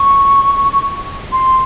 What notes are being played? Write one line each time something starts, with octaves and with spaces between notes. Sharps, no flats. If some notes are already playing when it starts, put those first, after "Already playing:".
Already playing: C#6
C6